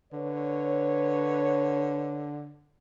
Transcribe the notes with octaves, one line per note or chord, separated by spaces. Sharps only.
D3 B4 C#5